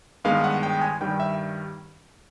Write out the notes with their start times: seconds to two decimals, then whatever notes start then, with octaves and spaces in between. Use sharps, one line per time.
0.24 G2 D#3 G#3 B3 F5
0.44 F#5
0.63 G5
0.81 G#5
1.00 G2 D#3 G3 G5
1.20 E5